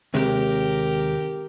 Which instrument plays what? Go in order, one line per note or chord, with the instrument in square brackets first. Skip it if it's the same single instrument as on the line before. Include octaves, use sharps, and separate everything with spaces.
[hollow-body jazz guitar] D#2 C3 G#3 [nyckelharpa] G4 A#4